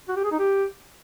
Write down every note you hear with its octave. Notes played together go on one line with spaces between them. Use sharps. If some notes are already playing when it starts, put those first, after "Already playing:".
F#4
G4
G#4
D#4
G4